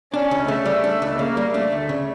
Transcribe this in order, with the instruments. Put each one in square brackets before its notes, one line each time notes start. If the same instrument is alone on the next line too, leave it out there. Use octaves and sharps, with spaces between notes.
[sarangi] C#4 [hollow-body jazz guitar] D4
[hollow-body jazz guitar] C#2
[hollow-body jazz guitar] C#3 [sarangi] A3
[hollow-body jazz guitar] G3
D4
C#2
[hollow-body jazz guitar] C#3 [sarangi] A#3
[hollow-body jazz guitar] G3
[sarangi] A3 [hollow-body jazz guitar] D4
[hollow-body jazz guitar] D2
C#3